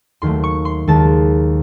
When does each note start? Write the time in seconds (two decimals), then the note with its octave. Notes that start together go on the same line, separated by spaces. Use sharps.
0.22 D#2 D#3 F#3 A3 C6
0.44 C#6
0.65 C6
0.88 D#2 D#3 G#3 A5